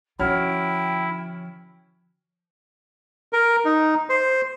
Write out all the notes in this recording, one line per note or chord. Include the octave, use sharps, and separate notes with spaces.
D3 F3 C#4 E4 F#4 G5 F6
A#4
D#4
C5